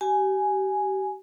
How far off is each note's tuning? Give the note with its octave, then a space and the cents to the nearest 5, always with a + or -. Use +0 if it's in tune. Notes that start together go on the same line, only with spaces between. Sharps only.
G4 -30 G#5 +0